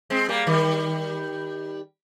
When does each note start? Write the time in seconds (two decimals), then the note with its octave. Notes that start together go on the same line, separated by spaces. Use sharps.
0.10 G#3 C4
0.29 G3 A#3
0.47 D#3 G3